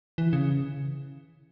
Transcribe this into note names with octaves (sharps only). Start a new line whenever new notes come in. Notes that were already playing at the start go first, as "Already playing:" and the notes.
E3
C#3